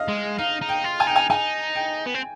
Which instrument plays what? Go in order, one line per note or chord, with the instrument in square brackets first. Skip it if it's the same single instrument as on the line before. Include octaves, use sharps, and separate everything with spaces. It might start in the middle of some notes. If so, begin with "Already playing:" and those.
Already playing: [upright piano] D#5 F5
[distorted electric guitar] G#3
[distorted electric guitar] D#4 [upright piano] F5
[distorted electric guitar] D#4
[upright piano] G5
[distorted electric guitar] F4
[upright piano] G#5
[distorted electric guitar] D#4 [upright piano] G5
[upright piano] G#5
[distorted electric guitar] D#4 [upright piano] G#5
[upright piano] G5
[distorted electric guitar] B3
C4